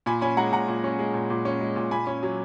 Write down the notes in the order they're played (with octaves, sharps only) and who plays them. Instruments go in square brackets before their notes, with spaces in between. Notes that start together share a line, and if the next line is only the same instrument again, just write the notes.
[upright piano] A#2 G#5 B5
C#4 G#5 B5
G#3 F#5 A#5
A#2 F#5 A#5
A#2
C#4
G#3
A#2
A#2
C#4
G#3
A#2
A#2 G#5 B5
C#4
F#3